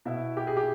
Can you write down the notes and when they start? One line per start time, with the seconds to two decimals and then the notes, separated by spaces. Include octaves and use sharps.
0.05 B2 E4
0.37 G4
0.47 G#4
0.57 G4